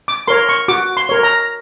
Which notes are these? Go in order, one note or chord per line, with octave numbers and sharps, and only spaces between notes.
D6
A#4 C#5 C6
C#6
F#4 D6
C6
A#4 C#5
A#5